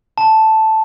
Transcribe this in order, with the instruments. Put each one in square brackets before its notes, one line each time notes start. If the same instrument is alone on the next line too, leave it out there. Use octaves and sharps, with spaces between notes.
[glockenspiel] A5